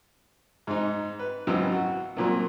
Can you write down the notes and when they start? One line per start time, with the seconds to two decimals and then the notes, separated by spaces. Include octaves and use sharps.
0.67 G#2 D#4
1.19 B4
1.47 G#1 C#2 F#3 E4
1.72 F#4
2.17 C2 A#2 F#3